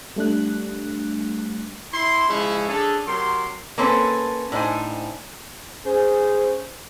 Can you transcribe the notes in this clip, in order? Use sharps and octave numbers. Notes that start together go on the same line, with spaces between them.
G3 A3 D4 F#6
E4 C6
C#3 F3 G#3 C#4 E4
C#4 D4 G#4 A4
C3 F#3 A#4 C6
A#3 C4 C#4 A4 B4
A2 D4 D#4 C5 G#5
C#4 G#4 C5